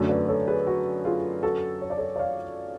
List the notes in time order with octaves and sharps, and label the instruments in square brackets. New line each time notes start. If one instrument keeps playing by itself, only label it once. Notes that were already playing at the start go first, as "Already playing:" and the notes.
Already playing: [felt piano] F#2 D3 F#3 A3
[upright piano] B4 D5
A4 C#5
G#4 B4
F#4
F4 G#4
F#4 A4
C#5
D5
A4 C#5
D5
C#5 F5